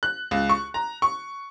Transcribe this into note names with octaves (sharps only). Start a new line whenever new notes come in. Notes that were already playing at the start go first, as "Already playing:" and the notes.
F#6
C#2
C#6
A#5
C#6